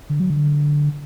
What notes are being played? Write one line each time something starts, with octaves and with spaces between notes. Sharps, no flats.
D3
F#3
D3